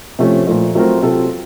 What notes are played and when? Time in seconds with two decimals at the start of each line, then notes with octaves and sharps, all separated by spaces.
0.19 C3 F3 A3 C#4
0.47 A#2 F3 A3
0.75 F#3 A3 C4 F4 A#4
1.02 C3 F#3 C4 F4 A4